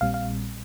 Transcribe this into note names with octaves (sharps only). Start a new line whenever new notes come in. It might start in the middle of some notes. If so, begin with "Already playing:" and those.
A#1 A#2 G3 C4 F5
F5